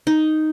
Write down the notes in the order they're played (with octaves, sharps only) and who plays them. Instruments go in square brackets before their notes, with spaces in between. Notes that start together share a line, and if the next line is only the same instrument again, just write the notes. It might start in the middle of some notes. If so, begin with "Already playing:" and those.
[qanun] D#4